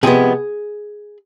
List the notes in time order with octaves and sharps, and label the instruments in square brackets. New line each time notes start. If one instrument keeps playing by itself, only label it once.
[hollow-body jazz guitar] C3 F3 G#3 B3 G#4